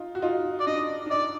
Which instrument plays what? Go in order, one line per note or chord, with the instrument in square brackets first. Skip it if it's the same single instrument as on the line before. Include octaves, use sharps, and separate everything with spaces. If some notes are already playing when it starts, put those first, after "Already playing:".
Already playing: [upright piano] D#4 F4
F#4
D#4 F4
[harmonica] D5
[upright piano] D4 [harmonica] D#5
[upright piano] D4
[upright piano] D#4 [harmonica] D5